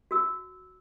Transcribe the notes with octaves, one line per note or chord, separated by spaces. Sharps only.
F#4 E6